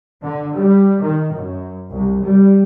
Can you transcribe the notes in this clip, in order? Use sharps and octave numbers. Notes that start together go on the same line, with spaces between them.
D3
G3
D#3
F#2
C2
G3